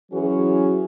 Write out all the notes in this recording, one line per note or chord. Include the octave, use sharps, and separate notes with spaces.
E3 F#3 C#4 F#4 G#4